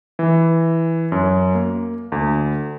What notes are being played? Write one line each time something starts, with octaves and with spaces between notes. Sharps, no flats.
E3
F#2
A#3
D2